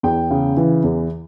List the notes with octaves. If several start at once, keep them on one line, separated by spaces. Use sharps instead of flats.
E2 G5
C#3
E3
E2